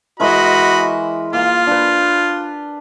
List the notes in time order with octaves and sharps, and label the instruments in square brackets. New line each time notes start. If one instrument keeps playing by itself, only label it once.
[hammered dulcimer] E3 G#3 A#4 [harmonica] F#4 D#5 B5
[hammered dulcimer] A#3 [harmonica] F4
[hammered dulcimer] D4 B4